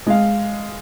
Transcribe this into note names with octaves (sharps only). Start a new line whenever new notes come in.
G#3 F5